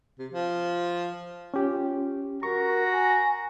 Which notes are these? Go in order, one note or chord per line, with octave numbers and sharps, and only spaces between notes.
C3
F3
C#4 F4 G4
F#4 A#4 A#5 C#6
G#5